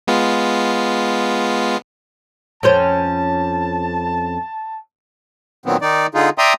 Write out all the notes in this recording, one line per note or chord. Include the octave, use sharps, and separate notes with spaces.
G#3 B3 F4
F2 C#4 C5 A5
A#2 D#3 F#3 B3 C4
D#3 D#4 D5
D3 D#4 F4 G#4
D5 E5 G5 A#5 C6 D#6